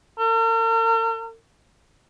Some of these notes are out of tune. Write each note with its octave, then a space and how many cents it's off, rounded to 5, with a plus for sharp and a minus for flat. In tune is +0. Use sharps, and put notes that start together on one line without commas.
A#4 -45